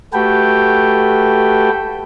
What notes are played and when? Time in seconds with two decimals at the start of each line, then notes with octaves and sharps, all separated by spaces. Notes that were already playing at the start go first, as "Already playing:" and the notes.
0.13 A3 F#4 G4 A4 B4 G5